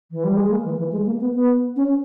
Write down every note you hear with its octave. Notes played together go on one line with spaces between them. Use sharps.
E3
G3
G#3
A#3
E3
E3
G#3
A#3
B3
B3
C#4